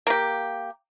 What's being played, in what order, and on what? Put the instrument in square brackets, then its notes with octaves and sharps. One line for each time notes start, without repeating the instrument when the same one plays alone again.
[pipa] A#3 G4